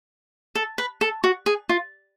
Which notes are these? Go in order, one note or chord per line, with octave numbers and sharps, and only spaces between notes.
A4
B4
A4
F#4
G#4
F4